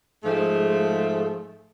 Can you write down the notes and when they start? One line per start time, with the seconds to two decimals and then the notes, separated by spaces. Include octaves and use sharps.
0.23 G#2 F3 G#3 A3